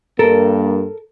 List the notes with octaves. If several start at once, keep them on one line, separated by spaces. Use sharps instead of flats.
G2 A#3 A4 A#4